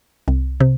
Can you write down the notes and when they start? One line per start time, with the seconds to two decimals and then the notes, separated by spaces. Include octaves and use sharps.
0.28 C2
0.60 C3